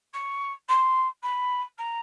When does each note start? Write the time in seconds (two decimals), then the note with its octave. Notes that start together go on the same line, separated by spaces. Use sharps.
0.13 C#6
0.68 C6
1.23 B5
1.78 A#5